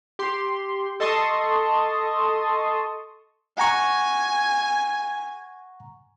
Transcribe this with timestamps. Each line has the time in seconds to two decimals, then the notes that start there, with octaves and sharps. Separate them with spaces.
0.19 G4 C6
1.00 A4 D#5 A5 C6 C#6 D#6
3.58 F#5 G#5 A#5 C#6